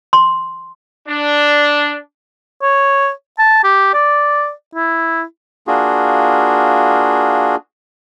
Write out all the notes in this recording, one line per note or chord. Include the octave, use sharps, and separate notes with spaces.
C6
D4
C#5
A5
G4
D5
E4
A#3 D4 F4 F#4 G#4